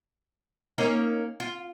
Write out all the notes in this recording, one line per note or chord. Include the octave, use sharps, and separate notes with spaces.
A#3 C#4 D#4
F4